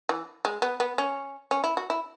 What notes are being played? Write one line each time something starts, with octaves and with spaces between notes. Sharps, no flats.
E3
G#3
B3
B3
C#4
C#4
E4
F#4
E4